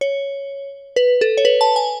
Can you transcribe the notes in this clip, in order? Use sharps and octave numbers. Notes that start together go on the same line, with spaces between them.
C#5
B4
A4
C#5
B4
A5
G#5